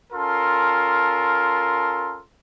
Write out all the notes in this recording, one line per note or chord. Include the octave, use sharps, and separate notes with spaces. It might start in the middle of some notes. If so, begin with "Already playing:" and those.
C#4 F4 A4 A#4 A5 C6